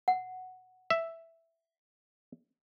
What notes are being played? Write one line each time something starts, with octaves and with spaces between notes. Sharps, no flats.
F#5
E5